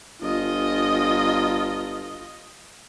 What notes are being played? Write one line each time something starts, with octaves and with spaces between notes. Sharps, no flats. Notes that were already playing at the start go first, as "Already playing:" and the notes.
G1 F4 D#5